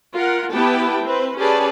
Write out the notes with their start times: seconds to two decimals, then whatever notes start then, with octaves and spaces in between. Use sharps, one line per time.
0.14 F4 A#4 F#5
0.52 B3 E4 G4 B4 G5 A5
1.04 C4 B4
1.37 C#4 G4 G#4 B4 D5 A5